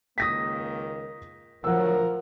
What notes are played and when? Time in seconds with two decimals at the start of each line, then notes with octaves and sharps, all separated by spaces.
0.18 C#2 D#3 A#3 D#6 A#6 B6
1.64 D2 A2 F3 F#3 A#4 F#5 E6